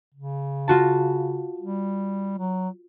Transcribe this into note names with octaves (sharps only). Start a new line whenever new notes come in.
C#3
F4 F#4 A5
G3
F#3